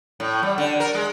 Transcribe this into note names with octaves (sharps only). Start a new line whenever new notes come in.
A2
G3
D3
A#4
G#3